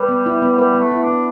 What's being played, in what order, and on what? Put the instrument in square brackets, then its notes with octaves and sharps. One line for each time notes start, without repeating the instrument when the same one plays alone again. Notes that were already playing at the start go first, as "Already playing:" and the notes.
Already playing: [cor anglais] G3 [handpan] B4
[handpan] B3
E4
B3
[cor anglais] G3 [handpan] B4
[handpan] B3
[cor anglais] A3
[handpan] E4
[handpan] B3 [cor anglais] D4